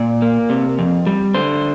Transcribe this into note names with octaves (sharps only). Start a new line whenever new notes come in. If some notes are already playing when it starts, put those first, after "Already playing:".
Already playing: A#2 D5
A#3
C3
F2
G3
D3 C5